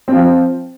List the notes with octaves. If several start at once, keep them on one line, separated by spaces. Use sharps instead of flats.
F3 C4 F4